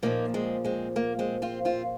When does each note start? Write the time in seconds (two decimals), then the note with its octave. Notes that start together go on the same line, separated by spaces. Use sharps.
0.03 A#2 F3 A#3 D#4
0.34 G#3 C4
0.64 G#3 C4
0.96 A#3
1.19 G#3 C4
1.42 C4 F4
1.65 C4 F4